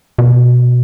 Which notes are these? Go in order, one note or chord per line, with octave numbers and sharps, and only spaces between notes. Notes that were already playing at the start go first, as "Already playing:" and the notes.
B2